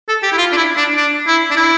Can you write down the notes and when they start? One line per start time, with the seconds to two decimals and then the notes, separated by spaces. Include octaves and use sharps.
0.08 A4
0.23 G4
0.32 E4
0.38 F4
0.53 D4
0.57 E4
0.78 D4
0.97 D4
1.27 E4
1.51 D4
1.57 E4